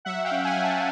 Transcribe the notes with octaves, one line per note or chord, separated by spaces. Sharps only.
F#3 E5 F#5
F5 G5
C#4
F#5 G#5
F#3
G5 A5